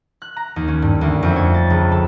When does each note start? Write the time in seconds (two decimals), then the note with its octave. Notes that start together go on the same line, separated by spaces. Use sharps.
0.22 F#6
0.37 A#5
0.56 D#2
0.68 C#4
0.82 G2
1.01 D2
1.23 F2
1.36 C#5
1.54 A6
1.70 C#2
1.92 A4